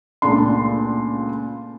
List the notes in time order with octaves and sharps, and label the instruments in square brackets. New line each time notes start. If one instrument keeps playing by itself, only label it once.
[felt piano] C#2 A#2 A3 D4 C6